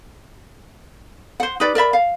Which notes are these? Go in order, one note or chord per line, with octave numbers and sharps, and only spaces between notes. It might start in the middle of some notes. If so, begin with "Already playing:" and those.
C5 F#5
D#4 G4 B4 D5
A#4 D5 E5 B5
F5